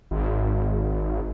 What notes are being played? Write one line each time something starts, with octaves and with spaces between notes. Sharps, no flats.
G#1